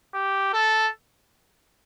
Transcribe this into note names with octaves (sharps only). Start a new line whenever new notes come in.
G4
A4